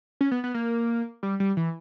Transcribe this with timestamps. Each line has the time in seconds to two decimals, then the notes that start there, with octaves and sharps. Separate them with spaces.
0.21 C#4
0.31 B3
0.44 B3
0.54 A#3
1.23 G3
1.40 G3
1.57 E3